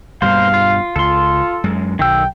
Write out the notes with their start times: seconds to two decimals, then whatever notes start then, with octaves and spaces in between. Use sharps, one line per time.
0.22 G2 B2 G3 A#3 C5 F5
0.54 F4
0.96 C#2 F4 A4 C6
1.64 F#2 G#3
1.99 B1 D#3 G5 E6